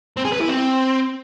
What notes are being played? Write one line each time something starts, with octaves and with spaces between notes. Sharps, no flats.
C4
G#4
B4
E4
C4